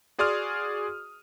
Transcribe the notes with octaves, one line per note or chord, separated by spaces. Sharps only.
F#4 G#4 D5 C6 D#6 F6